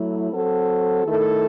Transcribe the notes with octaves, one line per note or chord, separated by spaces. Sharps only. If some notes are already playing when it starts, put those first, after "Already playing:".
Already playing: F#3 A3 E4
F#3 C4 F#4 A4
D#3 A3 E4 A4